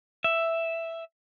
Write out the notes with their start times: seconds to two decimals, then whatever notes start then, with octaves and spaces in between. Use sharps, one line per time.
0.24 E5